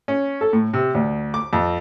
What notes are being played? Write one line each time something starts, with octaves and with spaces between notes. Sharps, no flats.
C#4
A4
A2
C3
D2
D6
F2